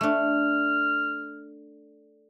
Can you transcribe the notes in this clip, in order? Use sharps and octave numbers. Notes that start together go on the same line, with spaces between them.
A3 D4 F6